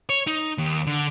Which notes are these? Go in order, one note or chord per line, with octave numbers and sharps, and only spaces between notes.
C#5
D#4
D#2
D3